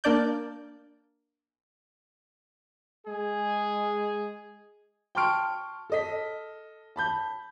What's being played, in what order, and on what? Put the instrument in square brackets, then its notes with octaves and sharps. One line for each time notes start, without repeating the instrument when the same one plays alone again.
[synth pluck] A#3 D4 D5 G6
[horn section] G#3 G#4
[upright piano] G5 A5 C6 C#6 F6 D7
A4 D#5 B6
A5 B5 G6